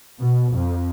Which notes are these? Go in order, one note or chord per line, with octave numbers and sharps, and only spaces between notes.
B2
F2